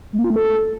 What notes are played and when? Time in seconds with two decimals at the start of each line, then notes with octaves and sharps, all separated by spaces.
0.13 G#3
0.19 A#3
0.24 F4
0.30 A3
0.36 A4